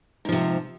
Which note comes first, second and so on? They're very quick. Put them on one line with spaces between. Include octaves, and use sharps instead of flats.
G#2 F3 C3